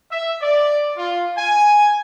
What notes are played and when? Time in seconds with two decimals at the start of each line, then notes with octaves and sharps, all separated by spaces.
0.10 E5
0.40 D5
0.97 F4
1.37 G#5